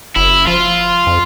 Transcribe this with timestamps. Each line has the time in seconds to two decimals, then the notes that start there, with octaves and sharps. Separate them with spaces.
0.16 F#1 E4
0.47 F3 F4
1.07 F2